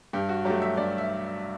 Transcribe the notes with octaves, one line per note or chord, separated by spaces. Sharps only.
G2 G4
F#4
F#3 A3 G4
E5
G2 D5
E5